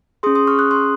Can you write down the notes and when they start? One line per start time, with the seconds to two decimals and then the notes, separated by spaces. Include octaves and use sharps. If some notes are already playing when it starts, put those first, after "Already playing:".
0.23 C#4 G#4 C6 D#6
0.35 C6 D#6
0.47 C#6 F6
0.59 D#6 F#6
0.71 C6 D#6